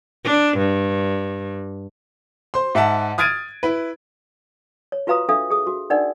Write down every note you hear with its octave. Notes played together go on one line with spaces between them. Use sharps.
D4
G2
C5 C6
G#2 E5 F#5 A5
D#6 F6 G#6 A6 D7 D#7
E4 B4
C#5
F4 F#4 B4 F5 A#5 D#6
D4 A4 E5 F5 D#6
G#4 D#6
F#4
D4 D#4 A#4 D5 F#5